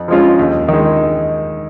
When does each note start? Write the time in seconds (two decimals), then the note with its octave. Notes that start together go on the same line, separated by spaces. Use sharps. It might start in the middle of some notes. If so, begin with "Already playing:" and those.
Already playing: F2
0.08 F3 G#3 C#4 F4
0.39 D#2
0.68 D#3 G#3